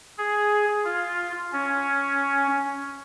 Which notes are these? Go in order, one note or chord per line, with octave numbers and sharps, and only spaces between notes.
G#4
F4
C#4